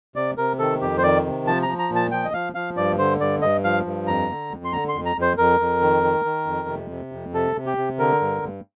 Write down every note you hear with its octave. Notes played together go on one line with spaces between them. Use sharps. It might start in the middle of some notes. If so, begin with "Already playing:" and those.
C3 D5
C3 A#4
D#3 A4
F2 G4
C5
D#3 D5
C3
F3 A5
A#5
F3
A#5
A#2
A5
F3 G5
D#5
F3 F5
F3 F5
G2 D5
D3 C5
G2 D5
G2 D#5
F3 F5
G2
F2 A#5
D3
F2
C6
D3 A#5
C6
F2
A#5
F2
C5
F2 A#4
F2
D#3
D#3
D#3
F2
C3
C3
F2
C3 A4
C3
G4
C3
D3 A#4
G2
G2